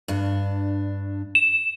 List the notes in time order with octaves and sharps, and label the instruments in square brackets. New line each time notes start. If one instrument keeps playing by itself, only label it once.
[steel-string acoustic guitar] G2 D4
[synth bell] E7